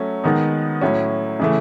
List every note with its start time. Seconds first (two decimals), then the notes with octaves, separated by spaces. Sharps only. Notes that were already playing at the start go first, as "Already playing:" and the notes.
Already playing: F#3 A3 C#4
0.24 D#3 G#3 B3 D#4
0.81 A2 F#3 C#4
1.40 C#3 E3 A3